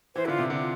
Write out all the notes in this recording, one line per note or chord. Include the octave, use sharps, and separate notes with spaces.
E3 C5
D3 E4 F4
C3
D3
F4